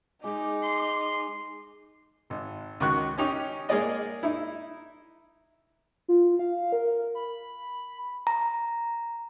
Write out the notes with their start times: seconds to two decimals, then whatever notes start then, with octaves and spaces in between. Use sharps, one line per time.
0.24 G#3 D#4 D6
0.62 C6
2.30 G#1
2.80 C#2 D#3 F#4 C#6 F#6
3.18 C#4 D#4 G4
3.69 G#3 A#3 G#4 D5 D#5
4.23 D#4 E4
6.08 F4
6.39 F5
6.72 A#4
7.15 B5
8.27 A#5